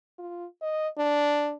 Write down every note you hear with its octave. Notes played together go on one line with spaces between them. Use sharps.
F4
D#5
D4